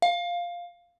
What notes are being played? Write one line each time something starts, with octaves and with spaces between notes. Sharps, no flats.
F5